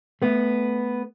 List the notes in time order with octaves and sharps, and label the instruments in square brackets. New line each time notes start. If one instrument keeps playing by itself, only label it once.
[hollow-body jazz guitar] A3 B3